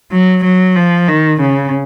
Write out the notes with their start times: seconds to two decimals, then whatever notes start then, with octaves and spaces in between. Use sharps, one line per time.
0.12 F#3
0.44 F#3
0.76 F3
1.08 D#3
1.40 C#3